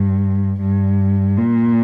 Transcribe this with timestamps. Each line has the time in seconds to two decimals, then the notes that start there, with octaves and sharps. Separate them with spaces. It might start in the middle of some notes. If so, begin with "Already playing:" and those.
Already playing: G2
0.61 G2
1.36 A#2